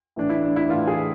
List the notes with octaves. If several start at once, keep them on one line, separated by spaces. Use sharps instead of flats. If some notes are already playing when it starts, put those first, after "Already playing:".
A2 E3 D4
E4
D4
E4
A2 E3 F4
G#4